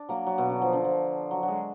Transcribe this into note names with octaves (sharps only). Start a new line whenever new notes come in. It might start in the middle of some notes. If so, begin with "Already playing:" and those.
Already playing: D4
F#3 A#3
F#3
B2
D3
F3
D3
F3
F#3
F#3
G#3